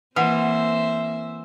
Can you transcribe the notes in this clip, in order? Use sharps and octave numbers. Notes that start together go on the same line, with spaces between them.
E3 A#3 C4 B4 C5 E5 F#5